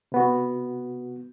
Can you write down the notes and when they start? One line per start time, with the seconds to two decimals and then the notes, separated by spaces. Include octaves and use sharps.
0.12 C3 B3 F#4